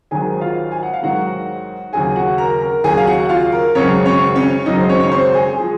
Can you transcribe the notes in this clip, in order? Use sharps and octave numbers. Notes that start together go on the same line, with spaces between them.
G#1 G#2 D#3 F#3 G#4 G#5
F4 F5
G#5
F#5
F5
G#1 G#2 D#3 F#3 F#4 F#5
D#2 C#3 F#3 G#4 G#5
F#4 F#5
A#4 A#5
A#4 A#5
D#2 C#3 F#3 G#4 G#5
F5
F#4 F#5
F#5
F4 F5
A#4
G#1 F#2 C#3 F#3 C#4 C#5
C#4 C#5
C#4 C#5
G#1 F#2 C#3 F#3 D#4 D#5
C5
C#4 C#5
C#5
C4 C5
G#4
G#4
F3 G#3